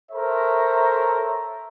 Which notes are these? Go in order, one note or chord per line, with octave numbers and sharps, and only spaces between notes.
A4 A#4 C5 C#5 E5 A#5